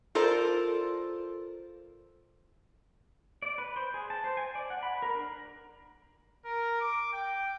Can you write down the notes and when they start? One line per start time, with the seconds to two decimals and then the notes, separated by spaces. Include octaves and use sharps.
0.15 F4 A4 A#4 C5 D5
3.42 D5
3.58 B4
3.76 C5
3.94 G#4
4.10 A5
4.24 C5
4.37 G#5
4.55 D5
4.70 F#5
4.83 B5
5.02 A#4
5.15 D4
6.45 A#4
6.81 D6
7.13 G5